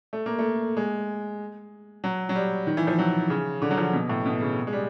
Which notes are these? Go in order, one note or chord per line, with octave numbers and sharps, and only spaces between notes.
A3
A#3
A3
G#3
F#3
F#3
G3
D#3
E3
F3
F#3
C#3
D3
F#3
F3
B2
A2
B2
C#3
G#3
G3